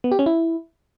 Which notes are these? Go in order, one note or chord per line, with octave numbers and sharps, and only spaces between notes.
B3
G4
C#4
E4